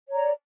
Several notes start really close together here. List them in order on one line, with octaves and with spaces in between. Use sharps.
C#5 A#5 D5